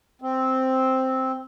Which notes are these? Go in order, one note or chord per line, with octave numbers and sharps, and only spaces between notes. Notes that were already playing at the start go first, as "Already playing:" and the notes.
C4